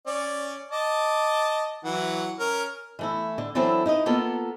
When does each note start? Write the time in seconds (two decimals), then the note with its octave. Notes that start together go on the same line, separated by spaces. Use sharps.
0.07 C#4 D5
0.71 D#5 A5 D6
1.84 E3 F#3 F#5
2.39 C#4 A#4
2.99 E3 A3 E4
3.38 D3
3.55 E3 F#3 C4 D4 E4 A4
3.86 D#4 E4 B4 D#5
4.06 A#3 B3 F4 A4